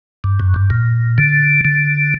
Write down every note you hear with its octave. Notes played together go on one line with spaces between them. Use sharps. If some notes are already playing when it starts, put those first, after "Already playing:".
G2
F#2
G2
A#2
D3
D3